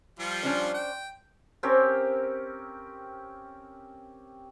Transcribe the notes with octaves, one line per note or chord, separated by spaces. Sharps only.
F3 G3 F4
C#4 D4 C5
G5
C4 C#4 G4 A#4